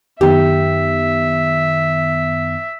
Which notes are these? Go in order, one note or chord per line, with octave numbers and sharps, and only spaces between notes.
F#2 D#3 B3 G4 E5